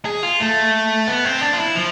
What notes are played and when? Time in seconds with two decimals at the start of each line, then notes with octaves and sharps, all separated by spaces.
0.05 G#4
0.23 F4
0.40 A3
1.07 B3
1.25 C4
1.41 D4
1.53 F4
1.58 E4
1.75 F3